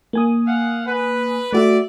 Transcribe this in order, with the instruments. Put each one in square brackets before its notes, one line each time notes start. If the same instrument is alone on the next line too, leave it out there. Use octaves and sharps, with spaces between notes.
[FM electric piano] A#3 G#5 D#6
[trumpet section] F5 F#5
B4
[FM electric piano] A3 F#4 [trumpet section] D5 E5